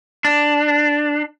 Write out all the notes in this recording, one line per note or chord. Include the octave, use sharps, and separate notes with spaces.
D4